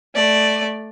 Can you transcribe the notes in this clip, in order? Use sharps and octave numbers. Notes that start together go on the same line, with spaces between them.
A3 D5